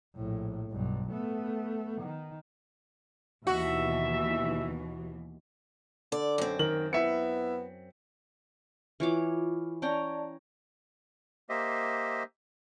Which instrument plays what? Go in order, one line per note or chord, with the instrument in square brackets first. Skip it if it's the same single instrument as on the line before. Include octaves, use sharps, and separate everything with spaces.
[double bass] A#1 A2
B1 G2
A3 B3
D#3
[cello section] D#2 B2 E3 [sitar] F#4 [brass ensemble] E5
[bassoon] D3 [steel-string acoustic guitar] D5
[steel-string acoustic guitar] F#2 C4
[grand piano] D#3 A#4 F#7
[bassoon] B3 [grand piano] E4 E5 C#7
[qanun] E3 C#5 D6 [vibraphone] F4
[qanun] C#4 G5 A#5 [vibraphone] D5 A5
[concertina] A#3 G4 C5 D#5 E5